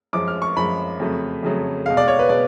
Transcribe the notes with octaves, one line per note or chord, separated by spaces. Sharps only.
F#2 F3 G#3 D6
F6
C#6
F#2 F3 G#3 B5
F2 C#3 F#3 A3
F2 C#3 F#3 A3
B2 G#3 F5
D5
C#5
B4
B2 G#3 D5